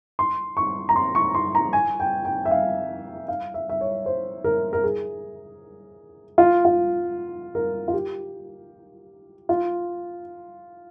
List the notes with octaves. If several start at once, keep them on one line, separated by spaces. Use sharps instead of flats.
C6
C#6
A#5
C6
C#6
C6
A#5
G#5
G5
G5
E5
F5
F5
E5
E5
C#5
C5
A#4
A#4
G#4
F4
F4
A#4
F4
G4
F4